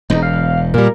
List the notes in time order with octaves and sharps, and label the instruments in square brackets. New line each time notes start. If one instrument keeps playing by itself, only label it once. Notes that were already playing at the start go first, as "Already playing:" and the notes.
[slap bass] E1 E2 [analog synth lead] D#4
[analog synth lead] F5
[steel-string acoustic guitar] A#2 G3 [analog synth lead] A#4